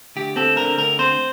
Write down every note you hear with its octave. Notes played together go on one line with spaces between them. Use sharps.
D2 G4
C4 A4
D3 A#4
D2 A#4
C4 C5